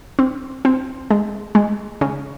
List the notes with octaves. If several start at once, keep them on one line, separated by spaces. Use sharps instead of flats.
C4
C4
G#3
G#3
C#3